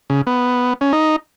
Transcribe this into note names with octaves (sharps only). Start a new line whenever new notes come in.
C#3
B3
C#4
D#4